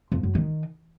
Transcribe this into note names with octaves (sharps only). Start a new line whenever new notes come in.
F2
F#2
D#3